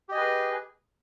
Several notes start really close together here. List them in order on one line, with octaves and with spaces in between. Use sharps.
G4 D#5 G#5 B4 G#4